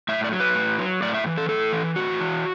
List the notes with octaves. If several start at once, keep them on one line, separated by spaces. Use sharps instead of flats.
A2 E5
D5
F#3
B4
A2
F#3
A2 D5
E5
E3
A4
A2 A4
E3
A2 F#4
E3